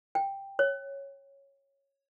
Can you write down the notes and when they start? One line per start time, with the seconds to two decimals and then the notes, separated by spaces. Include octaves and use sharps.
0.15 G5
0.59 C#5